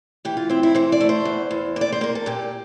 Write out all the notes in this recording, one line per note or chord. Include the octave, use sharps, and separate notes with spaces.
E3 G4
F4
C4 E4
E4
E3 C5
D5
A3
C5
E2
E2
A#3
D5
C5
A#3 A#4
A4
A#2 G4